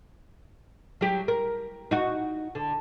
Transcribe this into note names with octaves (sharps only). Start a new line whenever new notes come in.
F#3 G4
A#4
D#4 F#4
D3